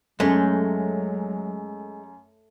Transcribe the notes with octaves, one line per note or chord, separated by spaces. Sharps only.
F#2 F#3 G#3 A3 C#4